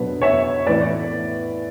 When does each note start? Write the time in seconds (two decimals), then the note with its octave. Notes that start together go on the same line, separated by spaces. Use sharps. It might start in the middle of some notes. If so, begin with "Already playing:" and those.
Already playing: B2 F#3 B3 D4 B4
0.21 C#5 E5
0.67 A2 E3 B3 B4 D5